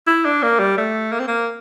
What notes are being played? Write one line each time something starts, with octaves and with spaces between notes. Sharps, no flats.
E4
D4
A#3
G3
A3
A#3
C4
A#3